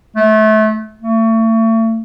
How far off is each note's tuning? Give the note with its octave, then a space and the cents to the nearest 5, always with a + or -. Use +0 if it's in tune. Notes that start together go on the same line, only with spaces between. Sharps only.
A3 -25
A3 +35